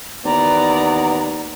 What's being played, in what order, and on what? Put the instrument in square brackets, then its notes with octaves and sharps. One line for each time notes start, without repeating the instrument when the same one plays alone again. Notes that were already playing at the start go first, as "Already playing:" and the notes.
[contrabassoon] D#2 [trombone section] E3 B3 [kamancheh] D5 A#5